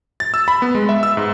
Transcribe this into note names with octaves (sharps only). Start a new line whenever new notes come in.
A6
E6
B5
B3
G#3
E5
E6
G#2